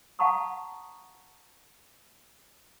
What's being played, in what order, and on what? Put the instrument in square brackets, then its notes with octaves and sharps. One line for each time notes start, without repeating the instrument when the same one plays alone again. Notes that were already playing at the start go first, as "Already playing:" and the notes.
[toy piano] F5 F#5 A5 A#5 C#6 D#6